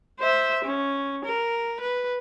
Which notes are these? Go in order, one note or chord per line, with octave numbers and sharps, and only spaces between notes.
C5 E5
C#4
A#4
B4